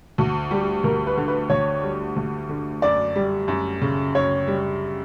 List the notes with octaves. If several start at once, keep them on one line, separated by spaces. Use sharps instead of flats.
D2 F#4
G3 G4
D2 A#4
B4
D3
B4
D2 C#5
G3
D2
D3
F#2 D5
G3
F#2
C#3
F#2 C#5
G3